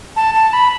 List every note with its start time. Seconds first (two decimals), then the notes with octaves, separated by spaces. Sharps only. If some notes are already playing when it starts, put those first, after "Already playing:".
0.16 A5
0.34 A5
0.53 B5